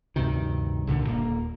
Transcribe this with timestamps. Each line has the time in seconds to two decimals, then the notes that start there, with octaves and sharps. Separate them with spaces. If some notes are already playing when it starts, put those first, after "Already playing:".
0.16 D2 G2 C3 D#3
0.87 C2 G2 A#2 D3
1.07 D#1 A#3